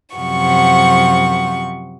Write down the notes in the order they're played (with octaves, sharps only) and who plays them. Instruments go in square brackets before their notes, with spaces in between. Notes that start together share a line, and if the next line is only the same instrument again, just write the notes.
[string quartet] F#2 C3 F3 F#5 C#6